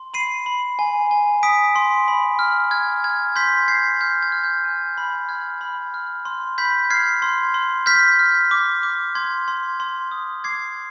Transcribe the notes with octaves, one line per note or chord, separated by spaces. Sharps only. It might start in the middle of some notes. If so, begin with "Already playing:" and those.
Already playing: C6
B5 C7 D#7
B5
G#5
G#5
D#6 B6 D7
C6
B5
F6
F6 G#6
F6 G#6
C6 G6 B6
G6 G#6 C7
F6 G6
G#6
F6
G6
G#5
B5
F6 G#6
B5
F6
C6
B5 G6 B6
F6 G#6 C7
C6
C6
F6 G6 B6
F6
D6
D6
C6 G#6
C6
C6
D#6
D6 G#6 C7